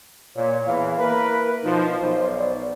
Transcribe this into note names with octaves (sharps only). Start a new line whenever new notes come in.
A#2 C#5
E2 E3 F5
A#3 E4 A#4 B4
B2 F3 D#4
B1 C5
D5